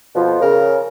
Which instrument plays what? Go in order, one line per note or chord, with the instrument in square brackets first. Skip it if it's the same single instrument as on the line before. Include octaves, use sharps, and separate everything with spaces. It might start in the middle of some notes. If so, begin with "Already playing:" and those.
[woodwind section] F2 B2 F3
[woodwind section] C#3 [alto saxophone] A#4